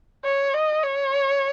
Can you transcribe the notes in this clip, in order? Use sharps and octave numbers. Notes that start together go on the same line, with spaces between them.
C#5
D#5
C#5